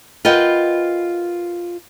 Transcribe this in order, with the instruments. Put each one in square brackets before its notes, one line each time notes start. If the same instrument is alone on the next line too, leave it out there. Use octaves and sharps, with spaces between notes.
[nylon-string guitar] F4 A#4 B4 D#5 F#5 G5